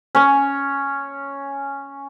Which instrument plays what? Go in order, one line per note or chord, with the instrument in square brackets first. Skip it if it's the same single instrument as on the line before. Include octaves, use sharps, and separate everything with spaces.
[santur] C#4 C#5